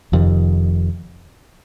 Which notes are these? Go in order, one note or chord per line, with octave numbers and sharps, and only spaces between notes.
F1 F2 C3 D#3